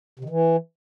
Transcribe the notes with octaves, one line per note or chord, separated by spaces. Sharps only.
C3
D#3
E3